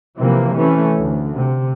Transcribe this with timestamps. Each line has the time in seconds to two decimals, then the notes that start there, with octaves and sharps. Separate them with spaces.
0.17 C3 E3 F3 A#3
0.55 E3 A3 C#4
0.97 D2
1.35 C3